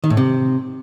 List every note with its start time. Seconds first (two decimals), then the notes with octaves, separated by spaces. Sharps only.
0.04 D#3
0.10 A2
0.17 C3